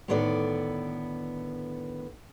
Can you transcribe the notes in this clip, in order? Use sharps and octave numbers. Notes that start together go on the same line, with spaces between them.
A2 D3 D#3 B3 A4 D5